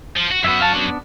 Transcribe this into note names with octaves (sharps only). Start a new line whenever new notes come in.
F3
F#4
F#2 B3 F#4 E5
F5 A5
B3 D4